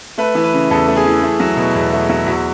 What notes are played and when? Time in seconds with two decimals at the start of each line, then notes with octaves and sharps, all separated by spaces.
0.18 A3 B4
0.35 E3
0.44 B4
0.53 C#3
0.70 E2 A4
0.88 A3
0.96 G#4
1.06 E3
1.22 A3
1.40 F#3
1.57 B2
1.75 E2
1.93 A3
2.09 F#3
2.26 E2 F#4